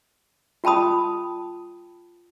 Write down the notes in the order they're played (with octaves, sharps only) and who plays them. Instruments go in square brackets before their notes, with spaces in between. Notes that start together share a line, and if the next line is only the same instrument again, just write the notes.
[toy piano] F4 G5 A5 B5 D#6